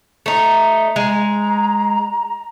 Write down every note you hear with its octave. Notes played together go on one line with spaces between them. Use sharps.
A3 D#4
G#3 A#5